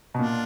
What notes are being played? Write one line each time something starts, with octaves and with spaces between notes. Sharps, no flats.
B2
A#2 D4 F4